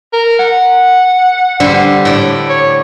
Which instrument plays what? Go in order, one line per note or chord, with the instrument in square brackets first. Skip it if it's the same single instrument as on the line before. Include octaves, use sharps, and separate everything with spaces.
[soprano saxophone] A#4
F#5
[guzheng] D3 G3 C5
A2 D5
[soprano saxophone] C#5